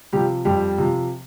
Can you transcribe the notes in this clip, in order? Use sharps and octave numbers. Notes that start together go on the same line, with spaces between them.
C3 F3 G3 G4
F2 G3 G4
C3 F3